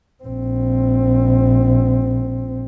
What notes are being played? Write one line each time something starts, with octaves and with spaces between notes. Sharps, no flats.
A#1 C4